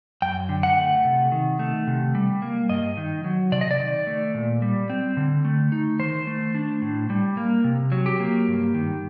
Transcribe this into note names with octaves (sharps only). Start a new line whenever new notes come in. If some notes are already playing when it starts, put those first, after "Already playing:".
F#2 G5
D3
F#5
A3
C3
D#3
A3
C3
G3
A#3
G2 D#5
D#3
F#3
C3 D5
D#5
D5
D#3
A3
A#2
G3
C4
D3
A3
D#4
D#3 C5
A3
D4
A2
G3
A#3
C3
F#3
G4
A#3
G2
D#3